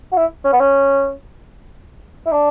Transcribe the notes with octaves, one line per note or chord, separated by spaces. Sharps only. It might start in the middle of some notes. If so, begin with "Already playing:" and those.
F#4
E4
C#4
B3
C#4
E4
D4